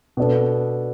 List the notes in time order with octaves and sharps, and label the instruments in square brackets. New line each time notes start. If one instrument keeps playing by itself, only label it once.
[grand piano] B2 B3 D4 A4